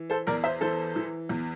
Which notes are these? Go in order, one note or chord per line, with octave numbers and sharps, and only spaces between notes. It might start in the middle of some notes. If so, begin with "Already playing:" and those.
Already playing: E3
A4 C5
E2 A#4 D5
C5 E5
E3 A4 C5
E3
E2